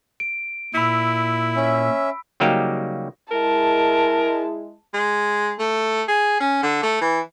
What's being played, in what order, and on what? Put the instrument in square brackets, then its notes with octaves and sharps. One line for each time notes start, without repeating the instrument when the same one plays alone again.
[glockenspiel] D7
[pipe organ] A#2 [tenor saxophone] E4 [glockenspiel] B5 E6 B6
[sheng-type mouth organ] C#4 E5
[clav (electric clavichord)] C#3 F#3 G3 A#3 D#4 G4
[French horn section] G#3 E4 [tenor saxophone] A#4 [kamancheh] A5
[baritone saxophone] G#3
A3
G#4
C#4
D3
A3
E3